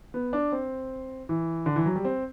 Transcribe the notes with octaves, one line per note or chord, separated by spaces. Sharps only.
B3
D4
C4
E3
D3
E3
F#3
G3
C4